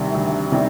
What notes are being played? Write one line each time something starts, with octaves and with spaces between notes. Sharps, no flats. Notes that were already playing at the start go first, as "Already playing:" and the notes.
Already playing: D2 C3 D#3 G3
D2
C3 D#3 G3